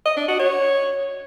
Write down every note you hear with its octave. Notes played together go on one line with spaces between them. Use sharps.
D#5
D4
F#4
C#5